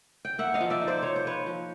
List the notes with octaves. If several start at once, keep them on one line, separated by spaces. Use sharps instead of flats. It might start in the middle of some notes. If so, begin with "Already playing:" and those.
G5
A#3 E5 F#5
D#5 F5
F3
D5 E5
D#4
C5 D5
F3 C#5
C5
A#3 B4 C#5
F3